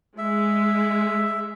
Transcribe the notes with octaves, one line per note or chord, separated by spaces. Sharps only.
G#3 E5